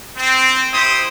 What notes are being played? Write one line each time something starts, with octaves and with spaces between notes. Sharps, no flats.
C4
E4 G4 C5 D#6